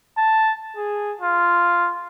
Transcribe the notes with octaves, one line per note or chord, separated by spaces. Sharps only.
A5
G#4
F4